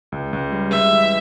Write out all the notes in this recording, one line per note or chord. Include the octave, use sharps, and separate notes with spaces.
C#2
C#2
G3
G#3 E5
E3